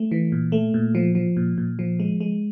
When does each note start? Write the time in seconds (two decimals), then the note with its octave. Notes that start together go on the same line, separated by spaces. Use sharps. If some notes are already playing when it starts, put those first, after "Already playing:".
Already playing: A3
0.11 E3
0.32 A#2
0.52 A3
0.74 A#2
0.95 F3
1.15 F3
1.37 A#2
1.58 A#2
1.79 F3
2.00 G#3
2.20 G#3